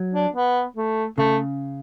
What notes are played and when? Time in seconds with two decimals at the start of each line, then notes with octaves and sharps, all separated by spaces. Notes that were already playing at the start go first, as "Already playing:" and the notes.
Already playing: F#3
0.14 D4
0.35 B3
0.76 A3
1.18 C#3 A3